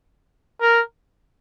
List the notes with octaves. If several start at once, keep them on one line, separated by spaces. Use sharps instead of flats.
A#4